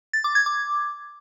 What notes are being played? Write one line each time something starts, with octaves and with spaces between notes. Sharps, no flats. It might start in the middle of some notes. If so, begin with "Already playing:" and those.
A6
D6
G#6
D6